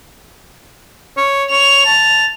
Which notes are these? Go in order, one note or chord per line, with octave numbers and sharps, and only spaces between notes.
C#5
C#5 F7
A5